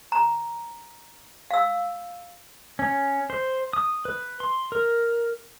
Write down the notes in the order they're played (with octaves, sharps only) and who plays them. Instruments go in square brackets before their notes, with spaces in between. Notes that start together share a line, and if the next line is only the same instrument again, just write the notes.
[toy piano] A#5
F5 E6
[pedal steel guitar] C#4
C5
D#6
B4
C6
A#4